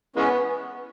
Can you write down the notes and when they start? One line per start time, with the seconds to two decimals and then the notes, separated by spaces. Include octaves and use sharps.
0.16 E3 G#3 B3 C#4